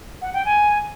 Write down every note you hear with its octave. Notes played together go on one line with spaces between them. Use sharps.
F#5
G5
G#5